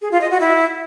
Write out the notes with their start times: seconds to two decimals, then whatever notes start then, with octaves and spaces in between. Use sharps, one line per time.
0.02 G#4
0.11 F4
0.21 D#5
0.31 F#4
0.40 E4